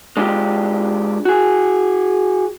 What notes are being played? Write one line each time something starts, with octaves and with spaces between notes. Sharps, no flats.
G#3 D4 F4 G4
F#4 G#4